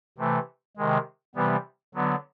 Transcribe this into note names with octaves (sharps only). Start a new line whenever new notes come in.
C3 E3 A3
C3 D#3 G#3
C3 E3 G3 B3
D3 F#3 B3